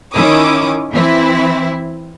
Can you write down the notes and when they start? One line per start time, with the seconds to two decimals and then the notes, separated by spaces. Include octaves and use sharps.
0.14 D#3 C#4 E4 D6 D#6
0.92 E3 C4 E4